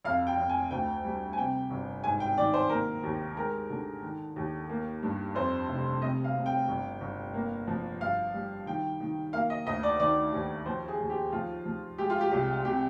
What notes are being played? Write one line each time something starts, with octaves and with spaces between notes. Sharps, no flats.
F2 F5
G5
F2
G#5
D2 G5
G3
G#5
C3 G5
G1
G#2 G#5
G5
D#3 D5
C5
A#3 A#4
D#2
G#3 A#4
D3
D#3
D#2
A#3
G2
F2 C5
F1
C3 D#5
F5
C3
G5
G1
G1
A#3
F3
G2 F5
G3
D#3 G5
D#3
A#3 F5
D#5
D2 D#5
D5
D#3 D5
D#2
F3 C5
G#4
D#2
G4
F3 F4
F3
G#3 G4
F4
G4
C2 G4
C3 G4